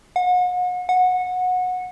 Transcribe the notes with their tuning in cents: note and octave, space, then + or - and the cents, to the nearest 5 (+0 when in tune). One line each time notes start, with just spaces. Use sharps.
F#5 -40
F#5 -20